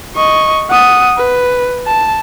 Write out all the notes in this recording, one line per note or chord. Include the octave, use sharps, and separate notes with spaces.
D#5 C#6
F#5 D#6
B4
A5